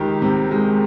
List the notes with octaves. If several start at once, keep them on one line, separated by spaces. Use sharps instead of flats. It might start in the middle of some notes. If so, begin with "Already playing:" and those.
Already playing: C#2 D#3 G4
C3
G#3